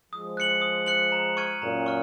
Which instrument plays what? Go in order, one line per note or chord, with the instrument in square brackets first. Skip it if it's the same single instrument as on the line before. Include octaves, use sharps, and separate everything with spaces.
[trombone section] F3 G#3 [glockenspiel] D#6
[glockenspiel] F#6 C#7 F#7
D#6
F#6 C#7 F#7
A#5
C#6 F6 G#6 D#7
[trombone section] F#2 A#2 [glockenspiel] A#5
[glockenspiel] C#6 F6